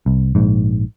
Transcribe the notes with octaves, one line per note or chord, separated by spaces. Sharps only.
C2
A#1 G#2